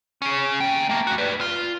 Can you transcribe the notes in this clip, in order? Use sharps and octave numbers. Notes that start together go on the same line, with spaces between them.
C#4 G#4
A#3 G5
A3 A#3
D#2 F#4
B4 D5
F4